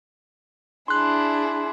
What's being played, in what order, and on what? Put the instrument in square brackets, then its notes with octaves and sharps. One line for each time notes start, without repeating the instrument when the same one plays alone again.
[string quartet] D4 E4 G#4 [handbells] C6 F#6